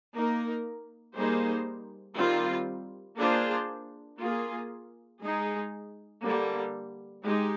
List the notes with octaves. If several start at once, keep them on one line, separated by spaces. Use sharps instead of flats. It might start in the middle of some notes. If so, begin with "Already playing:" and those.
A#3 D#4 A#4
G3 A#3 D#4 G#4 C5
D#3 G3 C4 F4
A#3 D4 F4 G#4 C5
A#3 F4 G#4
G#3 D#4 G#4
D3 G3 A#3
G#3 D#4 G4